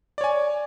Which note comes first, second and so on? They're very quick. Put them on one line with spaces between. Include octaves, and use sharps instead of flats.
D5 C#5 G#5